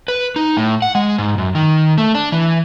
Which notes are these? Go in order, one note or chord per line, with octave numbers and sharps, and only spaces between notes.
B4
D#4
A2
F#5
G#3
G#2
F#2
D#3
A3
D4
E3